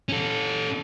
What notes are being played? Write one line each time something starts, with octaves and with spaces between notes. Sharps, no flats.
C#4 A4